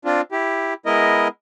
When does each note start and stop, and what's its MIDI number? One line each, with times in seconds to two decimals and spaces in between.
0.05 0.21 60
0.05 0.21 62
0.05 0.21 65
0.32 0.74 64
0.32 0.74 67
0.86 1.28 56
0.86 1.28 59
0.86 1.28 64
0.86 1.28 70
0.86 1.28 75